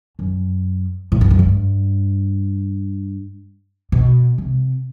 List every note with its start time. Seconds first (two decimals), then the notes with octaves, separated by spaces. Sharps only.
0.19 F#2
1.12 A2
1.21 G2
1.31 F#2
1.39 G2
3.92 B2
4.38 C3